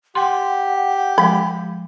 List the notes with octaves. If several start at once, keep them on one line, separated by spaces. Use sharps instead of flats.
G4 F#5 G5 C6
F3 G#3 B5